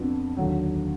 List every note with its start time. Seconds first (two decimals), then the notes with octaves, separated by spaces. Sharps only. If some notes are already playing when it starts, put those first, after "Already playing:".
Already playing: F2 F3 B3 D4
0.37 D#2 D3 F#3